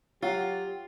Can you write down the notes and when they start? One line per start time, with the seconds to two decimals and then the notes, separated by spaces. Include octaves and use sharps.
0.23 F#3 F4 G4